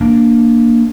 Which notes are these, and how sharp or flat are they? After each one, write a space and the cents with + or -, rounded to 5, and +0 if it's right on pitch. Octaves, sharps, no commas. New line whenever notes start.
A#3 +0 D4 +0